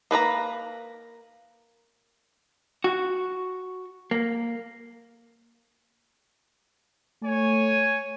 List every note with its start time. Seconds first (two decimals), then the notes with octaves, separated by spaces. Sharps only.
0.11 A#3 B4 D5 A#5
2.84 F#4
4.11 A#3
7.22 A3 C#5 G#5